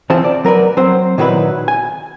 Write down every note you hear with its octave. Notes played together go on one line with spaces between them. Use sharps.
E3 F3 C4 A5
D5
F#3 A#4 B4 D5
F#3 C4 C5
A#2 D#3 F#3 E4 B4
G#5